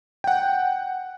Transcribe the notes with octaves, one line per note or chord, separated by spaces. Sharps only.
F#5 G5